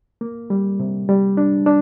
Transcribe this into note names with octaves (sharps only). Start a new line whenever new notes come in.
A#3
G3
C3
G3
D4
D4